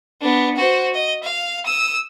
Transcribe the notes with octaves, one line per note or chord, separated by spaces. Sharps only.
B3 D4
F#4 C5
D#5
F5
D#6 E6